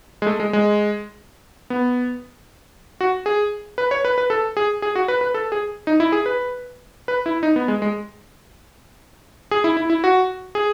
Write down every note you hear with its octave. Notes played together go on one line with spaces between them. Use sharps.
G#3
A3
G#3
G#3
B3
F#4
G#4
B4
C#5
B4
B4
A4
G#4
G#4
F#4
B4
B4
A4
G#4
D#4
E4
G#4
B4
B4
E4
D#4
B3
G#3
G#3
G#4
E4
E4
E4
F#4
G#4